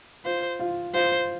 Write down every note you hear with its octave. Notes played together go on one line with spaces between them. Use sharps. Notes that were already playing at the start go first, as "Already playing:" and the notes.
F4 C5
F4
F4 C5